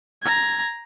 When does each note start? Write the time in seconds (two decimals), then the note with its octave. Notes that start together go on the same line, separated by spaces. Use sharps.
0.23 A#5 G#6